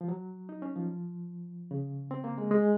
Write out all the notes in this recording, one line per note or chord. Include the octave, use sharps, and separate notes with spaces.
F3
F#3
D#4
C#4
F3
C#3
C4
A#3
G#3
G#3